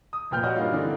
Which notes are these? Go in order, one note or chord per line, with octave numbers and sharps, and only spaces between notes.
D#6
F1 A#2 B4 G5 F6 G6
G3 F#4 C#5 D#5 F#5
G2 A#3 D#4 F4
D3 E3 A3 C4 D4 D#4